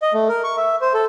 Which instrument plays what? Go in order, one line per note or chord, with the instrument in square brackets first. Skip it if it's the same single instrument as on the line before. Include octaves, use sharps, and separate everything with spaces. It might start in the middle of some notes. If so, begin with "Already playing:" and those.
[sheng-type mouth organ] D#5
A3
A#4
C#6
E5
C5
A4